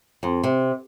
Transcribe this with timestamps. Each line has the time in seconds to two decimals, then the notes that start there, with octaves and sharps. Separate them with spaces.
0.23 F2
0.44 C3